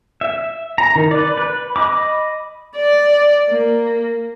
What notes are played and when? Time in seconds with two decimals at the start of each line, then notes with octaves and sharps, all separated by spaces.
0.21 E5
0.78 A#5
0.96 D#3
1.11 B4 D5
1.38 B4
1.76 D#5 B5 D6
2.77 D5
3.48 A#3